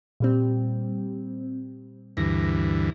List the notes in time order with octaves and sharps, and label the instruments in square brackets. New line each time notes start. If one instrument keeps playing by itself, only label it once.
[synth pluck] A#2 G3 C4
[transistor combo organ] D2 G2 E3 [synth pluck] A#6